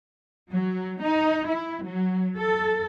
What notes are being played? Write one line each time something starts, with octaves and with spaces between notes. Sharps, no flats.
F#3
D#4
E4
F#3
A4